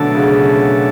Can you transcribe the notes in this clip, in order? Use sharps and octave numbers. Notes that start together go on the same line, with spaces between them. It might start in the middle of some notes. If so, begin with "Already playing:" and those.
Already playing: B2 D3 F#3 A3 D4 A4
C#3